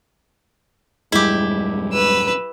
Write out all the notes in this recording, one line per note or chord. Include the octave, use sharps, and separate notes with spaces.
D#1 F#2 G3 G#3 E4 G4
B4 E6